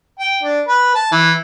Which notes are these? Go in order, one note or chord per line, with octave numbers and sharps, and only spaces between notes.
G5
D4
B4
A5
E3